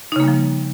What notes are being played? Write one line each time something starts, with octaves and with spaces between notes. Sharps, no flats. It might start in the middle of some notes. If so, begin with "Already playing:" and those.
C#3 F3 G3 A#3 D#4